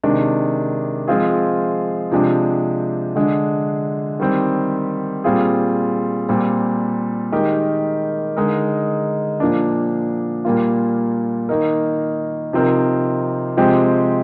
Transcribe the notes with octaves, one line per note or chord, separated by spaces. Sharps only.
C3 D#3 G#3 D4
F3 G#3 C4 F4 G#4
C3 F3 G#3 D4 G4
D3 G#3 D4
D#3 G3 C4 G4
A#2 G3 C4 F4 G#4
A#2 G3 C4
D#3 G#3 D#4 G4 A#4
D3 G#3 D#4 A#4
A#2 F3 A#3 D4
A#2 G3 A#3 F4
D#3 A#3 D#4 A#4
C3 F3 C4 D#4 A#4
C3 F3 G#3 C4 G4